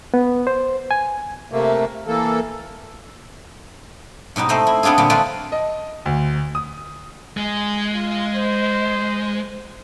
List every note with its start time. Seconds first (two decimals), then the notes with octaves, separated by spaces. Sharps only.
0.14 B3
0.47 C5
0.91 G#5
1.52 C3 A3 A#3
2.07 E3 A#3 A4
4.36 G#2 B2 G3 D#4
4.49 A3 C4 C5 D#5
4.67 E4
4.83 B3 C4 D4 F4 G#4
4.98 A#2 D3 G3
5.10 G#3 A3 C4 F4 B4 D5
5.52 D#5
6.06 D2
6.55 D#6
7.37 G#3 G#5
7.94 F4
8.34 C5